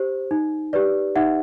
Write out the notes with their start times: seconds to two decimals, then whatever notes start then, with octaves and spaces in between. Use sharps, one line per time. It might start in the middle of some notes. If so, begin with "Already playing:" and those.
Already playing: G4 C5
0.31 D#4
0.73 G4 B4 D5
1.16 D#4 E5 F#5